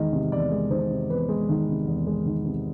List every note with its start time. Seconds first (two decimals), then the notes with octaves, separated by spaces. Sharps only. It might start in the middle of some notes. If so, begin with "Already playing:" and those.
Already playing: E2 D#3 G#3 D#5
0.13 C3
0.32 E2 D5
0.51 G#3
0.70 D#3 C5
0.90 C3
1.09 E2 B4
1.29 G#3
1.49 D#3
1.68 C3
1.87 E2
2.07 G#3
2.26 D#3
2.45 C3